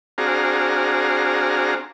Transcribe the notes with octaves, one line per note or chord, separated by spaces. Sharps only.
C4 D4 F#4 G#4 F5 A#5